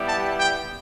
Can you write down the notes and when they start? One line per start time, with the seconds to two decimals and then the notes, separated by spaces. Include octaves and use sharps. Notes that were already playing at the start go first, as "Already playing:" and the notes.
Already playing: G3 B3 E4 G4
0.09 A5
0.40 G5